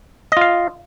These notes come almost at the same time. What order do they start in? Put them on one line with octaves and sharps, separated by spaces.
D#5 F4 F5